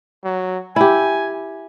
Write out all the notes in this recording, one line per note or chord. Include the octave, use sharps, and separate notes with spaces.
F#3
E4 G4 G#5